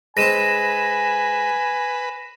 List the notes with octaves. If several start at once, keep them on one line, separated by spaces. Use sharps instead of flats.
G#2 G#3 C4 B4 G#5 A#6 D#7 E7